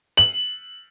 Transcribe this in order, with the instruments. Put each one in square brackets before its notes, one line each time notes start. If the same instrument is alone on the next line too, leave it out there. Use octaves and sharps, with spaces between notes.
[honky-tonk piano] F#7